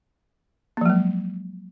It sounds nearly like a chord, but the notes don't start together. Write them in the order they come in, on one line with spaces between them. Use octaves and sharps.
A#3 F3 F#3 G#3